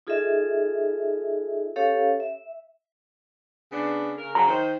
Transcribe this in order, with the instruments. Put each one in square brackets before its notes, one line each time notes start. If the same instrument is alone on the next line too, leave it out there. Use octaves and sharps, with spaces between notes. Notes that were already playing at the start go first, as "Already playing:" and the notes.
[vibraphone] D#4 F4 G#4 A4 D#5 E5
C#4 G4 A4 C#5 F5
E5
[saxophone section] C#3 B3 D4
C#3 A#4
[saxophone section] C#3 F#3 [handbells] A#5
[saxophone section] D#3 C5